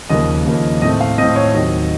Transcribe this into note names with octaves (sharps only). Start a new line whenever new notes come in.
D#2 C#3 F3 A#3 D#5
D#2 C#3 F3 A#3
A2 A3 C4 D#5
F5
A2 A3 C4 D#5
C#5
D#2 D#3 F#3 C4 D#5